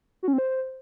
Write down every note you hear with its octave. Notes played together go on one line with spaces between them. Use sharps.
F#4
C#4
C4
C5